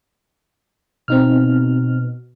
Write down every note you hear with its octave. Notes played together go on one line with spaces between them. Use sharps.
B2 C4 D#4 F6